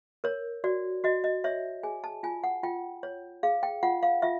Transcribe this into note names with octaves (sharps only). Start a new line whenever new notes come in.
A#4 C#5
F#4 D5
F#4 D#5
D#5
C#5 E5
G#4 G#5
A5
F4 G#5
F#5
F4 G5
C#5
G#4 F5
G5
F4 F#5
F5
F4 E5